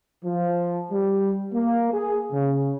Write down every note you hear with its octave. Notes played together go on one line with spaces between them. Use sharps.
F3
G3
A#3
G#4
C#3